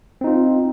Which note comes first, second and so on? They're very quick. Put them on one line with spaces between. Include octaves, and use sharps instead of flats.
C4 D#4 F4